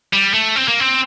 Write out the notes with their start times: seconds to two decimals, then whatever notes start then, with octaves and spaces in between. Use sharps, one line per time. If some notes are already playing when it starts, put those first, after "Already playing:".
0.13 G3
0.33 A3
0.56 C4
0.68 A#3
0.80 C4